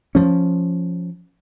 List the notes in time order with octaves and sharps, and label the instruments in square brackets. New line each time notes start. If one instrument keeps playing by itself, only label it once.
[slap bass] F3 C#4